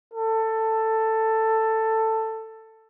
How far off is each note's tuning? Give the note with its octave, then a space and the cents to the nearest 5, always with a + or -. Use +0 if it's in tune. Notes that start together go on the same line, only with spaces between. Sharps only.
A4 +10